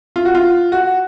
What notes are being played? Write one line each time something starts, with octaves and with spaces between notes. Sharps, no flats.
F4
F#4
F4
F#4